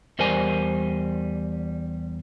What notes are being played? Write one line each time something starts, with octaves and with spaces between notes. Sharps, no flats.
E2 G3 A#4 C5 G#5